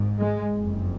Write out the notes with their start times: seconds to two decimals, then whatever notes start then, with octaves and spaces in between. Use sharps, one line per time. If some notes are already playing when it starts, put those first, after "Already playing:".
Already playing: G#1 G#2
0.18 G#3
0.54 F#1 F2